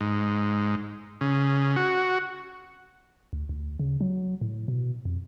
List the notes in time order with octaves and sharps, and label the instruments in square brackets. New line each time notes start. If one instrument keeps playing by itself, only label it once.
[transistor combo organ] G#2
C#3
F#4
[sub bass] D2
D2
C#3
F#3
A2
B2
F2